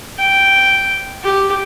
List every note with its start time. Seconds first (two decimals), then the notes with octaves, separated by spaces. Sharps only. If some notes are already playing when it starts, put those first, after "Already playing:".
0.18 G5
1.23 G4